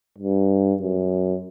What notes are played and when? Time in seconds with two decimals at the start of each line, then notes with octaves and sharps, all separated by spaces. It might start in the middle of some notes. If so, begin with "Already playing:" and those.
0.18 G2
0.82 F#2